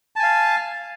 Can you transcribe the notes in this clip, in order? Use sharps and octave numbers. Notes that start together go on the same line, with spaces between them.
F5 G#5 A5